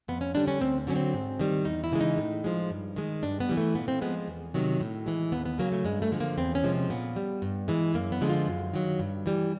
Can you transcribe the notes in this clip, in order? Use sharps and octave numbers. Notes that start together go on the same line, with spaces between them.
F2 B3
C#4
D3 G3 D4
C#4
D2 C4
D3 F#3 C#4
C4
G#2
D#3 G3
E2 D#4
E4
C#3 E3 G#3
D#4
A2
F3 G#3
G2
D#3 G#3
G2 D4
B3
E3 G3
A3
A#2 B3
C4
F3 G#3 B3
E2
C3 D#3 F#3
A2
E3 G#3
D#2 B3
B3
C#3 F#3 A#3
A3
G2 G#3
A3
D3 F3 G#3
A#3
E2 C4
C#4
C3 F3 G#3
A#2 B3
G3
G2
E3 G#3
F#2 A#3
B3
D3 F3 G#3
F4
F#2
D#3 F#3
G2
E3 G3